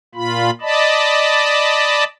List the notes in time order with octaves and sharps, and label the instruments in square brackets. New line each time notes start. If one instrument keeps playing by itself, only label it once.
[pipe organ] A#2 F4 B5
D5 D#5 A5 B5